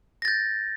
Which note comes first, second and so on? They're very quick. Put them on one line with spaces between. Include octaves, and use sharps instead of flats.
A#6 A6 G6